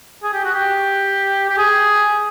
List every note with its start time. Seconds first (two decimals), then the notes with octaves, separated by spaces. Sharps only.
0.23 G#4
0.33 G4
0.45 F#4
0.54 G4
1.49 G4
1.58 G#4